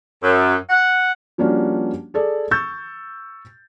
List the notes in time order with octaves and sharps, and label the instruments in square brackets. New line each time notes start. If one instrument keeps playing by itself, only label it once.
[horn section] F#2
F#5
[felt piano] F3 G3 A#3 C#4 D4 F#4
G#4 A4 D5
C#6 E6 G6 A6